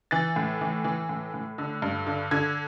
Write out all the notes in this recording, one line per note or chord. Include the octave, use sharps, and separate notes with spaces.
E3 A6
A2
E3
E3
A2
A2
D3
G2
D3
D3 G#6